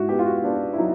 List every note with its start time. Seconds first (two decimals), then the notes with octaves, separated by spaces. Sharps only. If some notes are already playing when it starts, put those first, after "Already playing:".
Already playing: G#2 E4 F#4
0.09 B3 G4
0.19 F4
0.26 F#4
0.44 B3 D4
0.73 E4
0.78 F#3 D#4